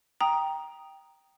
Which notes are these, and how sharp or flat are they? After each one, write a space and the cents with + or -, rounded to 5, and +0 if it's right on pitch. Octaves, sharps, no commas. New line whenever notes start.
G5 +0 A#5 +10 D#6 +0